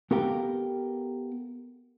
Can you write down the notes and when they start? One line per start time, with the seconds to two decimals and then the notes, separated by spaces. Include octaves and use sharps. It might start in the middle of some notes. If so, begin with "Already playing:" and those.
0.11 B3 G4 A4 A#4 F5 G5